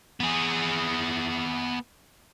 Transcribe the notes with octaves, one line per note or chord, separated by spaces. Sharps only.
B3 G#4